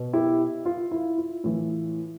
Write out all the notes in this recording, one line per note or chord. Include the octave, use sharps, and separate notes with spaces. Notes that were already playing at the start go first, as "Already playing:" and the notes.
Already playing: B2
E4 G4
F4
E4
F4
A2 E3